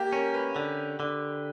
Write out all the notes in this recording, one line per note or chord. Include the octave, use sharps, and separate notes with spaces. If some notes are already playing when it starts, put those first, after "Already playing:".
Already playing: A#3 G4
C#4 A#4
B4
D3
D3